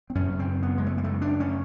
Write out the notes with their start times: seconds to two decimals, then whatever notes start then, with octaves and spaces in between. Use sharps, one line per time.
0.10 C4
0.15 F#2 C#3 C#4
0.39 C4
0.63 B3
0.78 G#3
0.86 A3
0.98 A#3
1.04 A3
1.22 D4
1.40 C#4